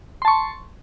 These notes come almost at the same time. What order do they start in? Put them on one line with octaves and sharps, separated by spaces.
C6 A5 C#6